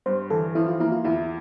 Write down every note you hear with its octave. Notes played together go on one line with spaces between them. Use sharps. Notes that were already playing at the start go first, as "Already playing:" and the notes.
G2 C5
E3 A4
F3 E4
F4
A#3 E4
F4
E2 E4